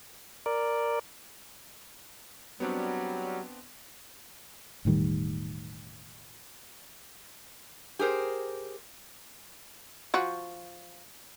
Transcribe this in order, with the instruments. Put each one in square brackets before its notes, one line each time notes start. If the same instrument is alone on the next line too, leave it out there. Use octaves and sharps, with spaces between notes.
[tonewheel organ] A#4 D5
[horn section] F#3 G3 [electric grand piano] B3 C4 D4
[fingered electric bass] E1 A2 D#3 G3
[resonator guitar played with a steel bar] G4 G#4 A#4 C5
[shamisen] F3 F#4